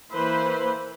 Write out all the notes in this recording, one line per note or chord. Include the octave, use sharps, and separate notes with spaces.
E3 A#3 B4 C5